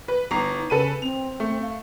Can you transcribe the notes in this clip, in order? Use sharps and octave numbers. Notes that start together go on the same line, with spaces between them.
B4
G1 D#4 A#5 C7
C#3 A4 B4 D#7
C4 F7
A3
F5